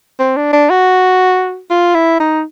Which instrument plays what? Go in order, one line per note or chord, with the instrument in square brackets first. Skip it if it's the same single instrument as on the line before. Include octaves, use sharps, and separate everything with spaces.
[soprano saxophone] C4
D4
D4
F#4
F4
E4
D#4